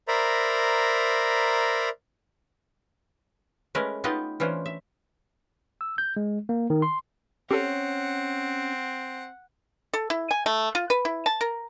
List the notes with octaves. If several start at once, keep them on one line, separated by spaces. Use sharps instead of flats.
A#4 C5 D5 E5 A#5 B5
G#3 A3 C#4 A#4 B4
B3 D#4 F4 G4 B4 D#5
E3 C#4 D4 F4 C5
E5
E6
G6
G#3
A#3
D#3
C6
C4 C#4 G4 A4 C#5 F#5
A4
E4
G#5
A3
F4
B4
E4
A5
A#4